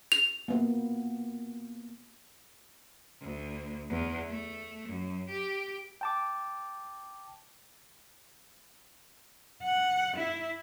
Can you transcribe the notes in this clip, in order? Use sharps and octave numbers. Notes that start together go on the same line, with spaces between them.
F7
A#3 B3
D2
E2
A3
F#2
G4
G5 A5 D6
F#5
E4